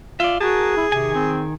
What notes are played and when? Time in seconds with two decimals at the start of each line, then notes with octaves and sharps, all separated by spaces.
0.20 F4 D5 E5
0.41 F#4 G#4 A#4 A5
0.77 E4
0.92 C3 D#3 G#5
1.15 C4